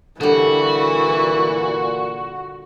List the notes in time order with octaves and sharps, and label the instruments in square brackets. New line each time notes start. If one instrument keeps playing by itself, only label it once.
[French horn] A#2 [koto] D3 G3 [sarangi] E3 [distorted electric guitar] F#4